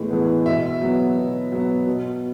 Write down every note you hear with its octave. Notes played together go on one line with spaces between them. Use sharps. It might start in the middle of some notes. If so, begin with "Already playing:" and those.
Already playing: A2 E3 G#3 B3
E3 G#3 B3
B2 E5
F#3 B3
B2
F#3 B3
B2